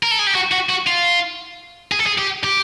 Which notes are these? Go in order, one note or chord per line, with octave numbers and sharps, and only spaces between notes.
A#4
A4
G#4
G4
F#4
F#4
F#4
F4
G#4
A4
G#4
G4
G4